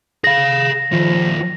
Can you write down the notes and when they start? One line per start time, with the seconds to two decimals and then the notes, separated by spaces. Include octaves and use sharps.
0.24 G#4 F5 A#6
0.92 D#3 F3 F4